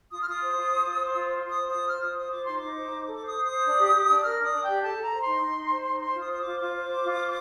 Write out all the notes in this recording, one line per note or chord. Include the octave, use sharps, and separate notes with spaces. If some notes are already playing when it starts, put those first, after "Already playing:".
F4 D#6
F6
F4 D#6
C5
F4
C5
F4
C5
F4
C5
F4 D#6
C5
D#6
F4
C5 F6
F4 D#6
C5 D#6
F4 D6
D#4 C6
D#4 D6
C5
D#4
A4
D6
C5 D#6
C5
D#6
C5
D4
G4
G4
D4
D#6
A#4 F6
D4 D#6
D4
G4 G5
A4 A5
A4 A#5
C5
D#4 C6
D#4
D#4
C5
D#4
C5 C6
F4
D#6
C5 D#6
F4 D6
F4 D6
C5
C5
F4
C5